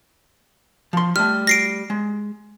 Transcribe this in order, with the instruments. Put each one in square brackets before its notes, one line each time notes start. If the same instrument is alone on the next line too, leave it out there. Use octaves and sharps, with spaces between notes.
[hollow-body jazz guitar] F3 C6
[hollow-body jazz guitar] G3 A3 [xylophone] F6
[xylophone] A#6 C7 D7
[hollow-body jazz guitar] G#3